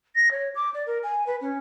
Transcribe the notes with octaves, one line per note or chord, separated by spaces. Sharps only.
A#6
C#5
D6
D5
A#4
G#5
B4
C#4